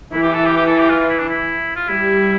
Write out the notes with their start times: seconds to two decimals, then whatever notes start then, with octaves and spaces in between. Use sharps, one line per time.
0.12 E3 E4
0.23 G4
0.34 A4
0.45 G4
0.57 G4
0.67 A4
0.78 G4
0.89 F4
1.00 F4
1.10 E4
1.19 D4
1.29 E4
1.76 F4
1.88 G3 E4